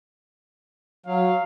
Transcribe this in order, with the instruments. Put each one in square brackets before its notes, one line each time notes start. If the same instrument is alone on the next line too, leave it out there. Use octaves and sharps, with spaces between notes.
[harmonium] F#3 [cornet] F5